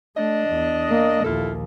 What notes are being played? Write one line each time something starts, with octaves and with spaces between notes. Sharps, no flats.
A3 D4 D#5
E2
A#3
A#1 D#2 E4 F4 A4